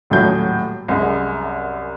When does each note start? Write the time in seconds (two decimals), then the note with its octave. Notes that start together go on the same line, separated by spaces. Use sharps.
0.10 D#1 A2 F#3 G6
0.88 C2 F#2 G#3